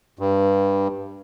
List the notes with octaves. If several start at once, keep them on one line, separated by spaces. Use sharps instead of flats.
G2